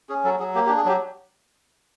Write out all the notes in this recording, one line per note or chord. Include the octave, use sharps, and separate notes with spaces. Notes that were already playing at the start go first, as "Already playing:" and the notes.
C#4 G#4
F#3 A4
F#3 G#4
A#3 G4
G4
D4
G#4
F#3 G4